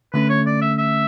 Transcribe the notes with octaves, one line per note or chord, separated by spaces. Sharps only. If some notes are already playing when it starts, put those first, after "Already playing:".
D3 A3 C#4 B4
C#5
D5
E5
E5